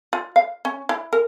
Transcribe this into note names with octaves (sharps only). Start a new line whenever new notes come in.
F4
F5
C#4
E4
A#4